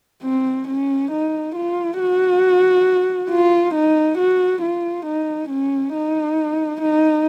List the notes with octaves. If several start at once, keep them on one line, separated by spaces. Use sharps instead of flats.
C4
C#4
D#4
F4
F#4
F4
D#4
F#4
F4
D#4
C#4
D#4
D#4